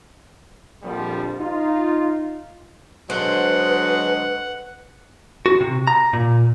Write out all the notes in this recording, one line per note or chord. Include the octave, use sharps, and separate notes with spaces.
A#1 F2 D3 F3 G3
D#4 F4
D3 F#3 G#3 B4 C5 F#5
F#4
C3
A#5
A#2